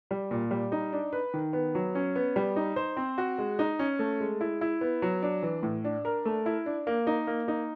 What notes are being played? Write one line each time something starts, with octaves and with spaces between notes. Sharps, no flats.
G3
A#2
G3
D#4
D4
B4
D#3
B3
F#3
C#4
B3
G3
D#4
C5
C4
F#4
G#3
D#4
C#4
A3
G#3
E4
E4
B3
F#3
D4
E3
A2
D4
A#4
A3
E4
D4
A#3
D#4
A#3
D#4